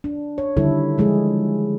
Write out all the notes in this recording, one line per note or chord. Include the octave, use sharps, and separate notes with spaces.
D4
C#5
D3 D#3 G3 E4 A4
F3 G#3 E4 G#4